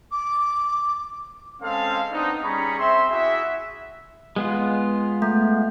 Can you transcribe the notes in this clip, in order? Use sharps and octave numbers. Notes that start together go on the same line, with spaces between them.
D6
G#3 C4 C#4 A4 F5
B3 C4 D4 D#4
G3 C#4 G#4 A#5 B5 C#6
C4 E5 C6
E4 F#4 G#4 E5
G#3 B3 F4
A3